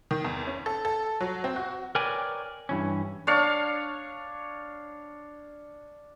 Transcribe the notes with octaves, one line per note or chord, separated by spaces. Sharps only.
D#3
E2
C#4
A4
A4
F#3
C4
F#4
A#4 B4 C#5 D5 G5 G#5
G2 E3 C#4
D4 C#5 F5